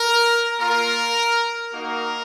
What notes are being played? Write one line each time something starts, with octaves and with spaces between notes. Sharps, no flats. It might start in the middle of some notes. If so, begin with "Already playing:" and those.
Already playing: A#4
A#3 F4 A#4
A#3 D#4 F#4 A#4